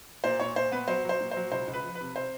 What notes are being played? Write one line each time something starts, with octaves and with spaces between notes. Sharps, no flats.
A#2 C5
A#2 C#5
A#2 C5
B3 B4
F#3 C5
F#3 C5
A#2
F#3 C5
C#2 C5
C#2
B4
F3
B4
C3
C3 C5